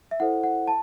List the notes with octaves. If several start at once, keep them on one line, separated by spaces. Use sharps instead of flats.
E5
E4 A4 C5 F#5
F#5
A5